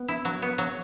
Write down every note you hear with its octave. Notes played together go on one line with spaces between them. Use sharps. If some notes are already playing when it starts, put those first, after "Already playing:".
Already playing: B3
E4
F#3
B3
F#3